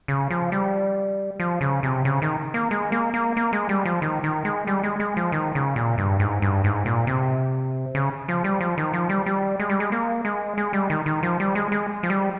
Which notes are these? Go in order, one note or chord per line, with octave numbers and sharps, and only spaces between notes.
C#3
F3
G3
F3
C#3
C3
C#3
D#3
A#3
G#3
A#3
A#3
A#3
G#3
G3
F3
D#3
D#3
G#3
G3
G#3
G#3
F3
D#3
C#3
A#2
G2
G#2
G2
G#2
A#2
C3
C#3
F3
G3
F3
D#3
F3
G3
G3
G#3
G3
G#3
A#3
G#3
G#3
G3
D#3
D#3
F3
G3
G#3
G#3
F3
G3